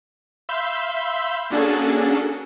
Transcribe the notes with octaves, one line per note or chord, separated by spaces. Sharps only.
E5 F5 B5 C6 E6 G6
A#3 C#4 D4 F#4 G#4 A4